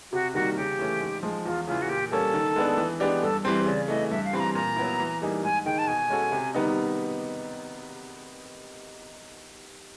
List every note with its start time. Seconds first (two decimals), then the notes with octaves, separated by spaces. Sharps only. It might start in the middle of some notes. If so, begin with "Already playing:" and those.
0.12 C3 F#4
0.34 D#3 G3 A#3 F#4
0.56 C#3 G4
0.79 E3 A3 C#4
1.00 G#2
1.23 F3 G#3
1.45 E2 F4
1.67 C#3 E3 F4
1.82 F#4
1.89 A#2 G4
2.11 G3 A#3 C#4 A4
2.33 D#3
2.56 G#3 B3 D4
2.77 E3
3.00 G#3 B3 D4 G4
3.22 G2 A4
3.44 E3 G3 C4 C5
3.66 C#3 D5
3.88 E3 A3 D#5
4.11 G2 E5
4.25 F5
4.33 E3 G3 C4 B5
4.40 A#5
4.55 A#2 A#5
4.76 F#3 B3 E4
5.00 E3
5.22 G3 A#3 D#4 G#4
5.43 G#2 G#5
5.65 D#3 G#3 G5
5.78 A5
5.87 B2 G#5
6.10 G#3 C#4 F#4 A4
6.32 C3
6.54 D#3 G3 B3 D#4